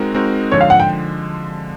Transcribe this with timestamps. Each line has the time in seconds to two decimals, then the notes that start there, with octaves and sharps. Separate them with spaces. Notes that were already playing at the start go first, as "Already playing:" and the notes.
Already playing: G#3 C4 D#4 F#4 A#4
0.14 G#3 C4 D#4 F#4 A#4
0.52 D3 F3 G#3 C#5
0.61 F5
0.70 F#5
0.80 G5